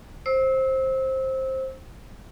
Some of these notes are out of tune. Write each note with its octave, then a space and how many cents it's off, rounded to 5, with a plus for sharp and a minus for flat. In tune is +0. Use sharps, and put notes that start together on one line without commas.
C5 +15 E6 -25